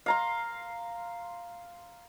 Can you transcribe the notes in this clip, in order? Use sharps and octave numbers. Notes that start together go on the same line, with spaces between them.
F5 A#5 C6